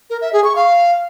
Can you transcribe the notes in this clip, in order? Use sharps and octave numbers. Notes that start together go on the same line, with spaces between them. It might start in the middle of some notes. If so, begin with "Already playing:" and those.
A#4
E5
G#4
C#6
F5